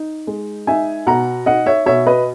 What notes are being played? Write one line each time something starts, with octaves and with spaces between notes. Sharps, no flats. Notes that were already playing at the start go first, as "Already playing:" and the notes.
Already playing: D#4
G#3
D#4 E5 G#5
B2 F#5 A#5
D#4 D#5 F#5
C#5 E5
B2 C#5 E5
B4 D#5